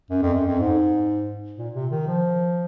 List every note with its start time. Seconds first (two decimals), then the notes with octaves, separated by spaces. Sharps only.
0.10 F#2
0.22 F2
0.34 F#2
0.47 F2
0.60 G#2
1.58 A#2
1.74 C3
1.91 D#3
2.07 F3